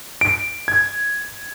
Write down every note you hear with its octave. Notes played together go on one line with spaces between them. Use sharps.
D7
G#6